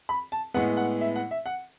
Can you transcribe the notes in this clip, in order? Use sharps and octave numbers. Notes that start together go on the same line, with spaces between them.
B5
A5
A2 G#3 B3 F#5
F#5
E5
F#5
E5
F#5